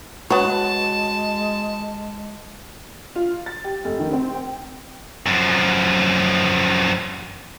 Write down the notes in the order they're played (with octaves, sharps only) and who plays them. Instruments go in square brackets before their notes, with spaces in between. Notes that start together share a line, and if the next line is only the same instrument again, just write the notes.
[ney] G#3 [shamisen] B3 C#5 [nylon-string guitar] F#4 [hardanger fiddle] A5
[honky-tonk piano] F4
A6
G4
F1
D#3
C4
G5
[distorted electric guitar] F#2 F3